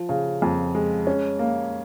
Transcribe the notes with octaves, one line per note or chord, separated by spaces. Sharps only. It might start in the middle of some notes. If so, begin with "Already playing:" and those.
Already playing: F3
C#3
F2
G#3
C#4
A#3